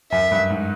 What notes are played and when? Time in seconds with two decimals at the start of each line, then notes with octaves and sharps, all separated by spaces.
0.11 F#2 E5
0.31 G2
0.50 G#2